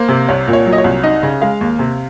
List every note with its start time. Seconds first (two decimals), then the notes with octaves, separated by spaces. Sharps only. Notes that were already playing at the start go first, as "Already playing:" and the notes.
Already playing: A#3 C5
0.09 C3
0.29 C2 C#5
0.48 A#2
0.53 C#5
0.66 F#3
0.73 D#5
0.78 C#5
0.84 C2
1.04 D#4 D#5
1.23 C#3
1.42 G#3 F5
1.61 D#2
1.79 C3